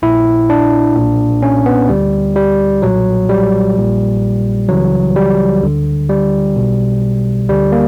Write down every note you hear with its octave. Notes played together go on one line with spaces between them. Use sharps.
A#1 A#2 E4
D4
B1 A#2
C#4
B3
D2 D3 G3
G3
B1 A#2 F#3
G3
A#1 A#2
C#2 C#3 E3 F#3
G3
D2 D3
G3
B1 B2
D2 D3 G3
A#3